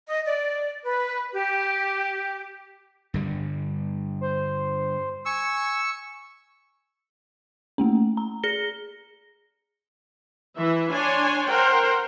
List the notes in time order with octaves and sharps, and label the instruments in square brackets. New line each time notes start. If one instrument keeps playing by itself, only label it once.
[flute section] D#5
D5
B4
G4
[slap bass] G2 D3 G3
[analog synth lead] C5
[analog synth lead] G#5 [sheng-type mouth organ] C#6 E6
[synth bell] A3 A#3 C#4
A#5
G#4 A#6 C#7 G7
[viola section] E3 E4 E5
D4 C#5 G#5 C6
A#4 C5 F#5 G5